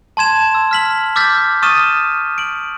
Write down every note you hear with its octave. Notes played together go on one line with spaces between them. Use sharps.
A5 C6 G#6 E7
E6
F6 B6 F#7
D6 E6 F6 G6 A6 B6
C#6 D#6 F6 A6 D#7 E7
D7 F#7